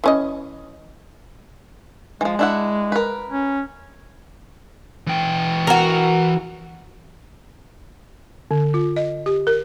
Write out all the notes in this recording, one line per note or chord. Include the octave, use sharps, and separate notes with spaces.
E3 C#4 D#5
E3 F3 G#3
D4 E4 F#5
A#4 B4
C#4
E3 G5
F#4 A#4
D3
F4
D#5
G4
A#4